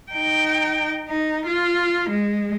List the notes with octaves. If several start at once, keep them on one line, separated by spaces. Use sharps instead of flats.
D#4 G5
D#4
F4
G#3